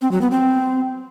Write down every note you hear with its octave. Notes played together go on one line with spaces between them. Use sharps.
C4
F#3
B3
C4